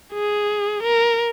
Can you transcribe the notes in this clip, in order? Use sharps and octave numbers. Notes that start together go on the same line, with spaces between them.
G#4
A#4